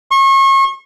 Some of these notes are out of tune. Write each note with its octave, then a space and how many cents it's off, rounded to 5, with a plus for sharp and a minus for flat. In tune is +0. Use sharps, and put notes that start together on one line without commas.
C#6 -35